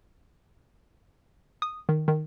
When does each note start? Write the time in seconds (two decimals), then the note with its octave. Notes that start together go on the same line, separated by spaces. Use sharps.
1.62 D#6
1.89 D#3
2.08 D#3